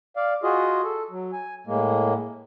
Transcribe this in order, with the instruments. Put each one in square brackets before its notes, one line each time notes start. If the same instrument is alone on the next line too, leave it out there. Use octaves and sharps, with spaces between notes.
[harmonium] D5 F5
F4 F#4 G#4 D#5
A4
F#3
G#5
A2 G#3 A#3